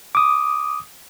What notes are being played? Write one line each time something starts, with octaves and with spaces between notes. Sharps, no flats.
D6 D#6